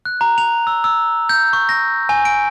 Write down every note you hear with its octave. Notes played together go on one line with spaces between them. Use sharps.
F#6
A#5
F7
E6
E6
G6
C#6
A#6
G#5
D7